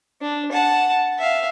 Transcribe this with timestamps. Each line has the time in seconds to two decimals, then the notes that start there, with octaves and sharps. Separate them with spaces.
0.21 D4
0.51 F#5 A5
1.18 E5 F5